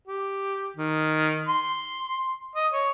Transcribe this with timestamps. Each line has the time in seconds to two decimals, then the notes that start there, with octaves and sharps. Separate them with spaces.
0.08 G4
0.77 D#3
1.49 C6
2.56 D#5
2.73 C#5